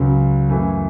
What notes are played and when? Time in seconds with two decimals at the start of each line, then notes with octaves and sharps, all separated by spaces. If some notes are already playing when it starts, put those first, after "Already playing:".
Already playing: C#2 C#3 F#3
0.48 F#2 E3 A3 E4